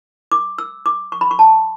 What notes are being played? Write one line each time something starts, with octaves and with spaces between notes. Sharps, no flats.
D6
E6
D6
C#6
B5
C#6
A5